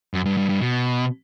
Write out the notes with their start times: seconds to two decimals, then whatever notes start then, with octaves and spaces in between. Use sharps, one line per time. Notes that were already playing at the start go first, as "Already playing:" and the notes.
0.14 F#2
0.25 G2
0.37 G2
0.49 G2
0.61 B2